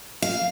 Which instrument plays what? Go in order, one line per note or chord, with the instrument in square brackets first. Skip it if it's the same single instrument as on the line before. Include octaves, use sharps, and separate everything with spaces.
[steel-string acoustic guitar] F5